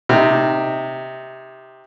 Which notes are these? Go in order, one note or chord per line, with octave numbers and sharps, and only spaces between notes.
C3 D#4